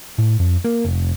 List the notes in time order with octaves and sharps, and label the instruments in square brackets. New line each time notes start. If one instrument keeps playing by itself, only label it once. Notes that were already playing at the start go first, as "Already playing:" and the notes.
[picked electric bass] A2
F2
A#3
F1